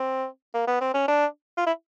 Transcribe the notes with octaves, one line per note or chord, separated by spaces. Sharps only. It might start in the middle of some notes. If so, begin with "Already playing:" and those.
Already playing: C4
A#3
B3
C4
C#4
D4
F4
E4